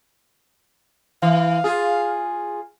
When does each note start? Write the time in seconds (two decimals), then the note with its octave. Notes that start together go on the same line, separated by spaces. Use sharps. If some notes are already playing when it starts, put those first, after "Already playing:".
1.22 E3 F5
1.64 F4 G#4